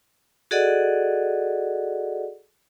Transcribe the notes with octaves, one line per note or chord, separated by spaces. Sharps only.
F#4 G#4 A4 D5 D#5 F#5